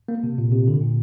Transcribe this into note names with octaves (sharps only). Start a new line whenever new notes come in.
A#3
C3
A#2
C3
D3
A#2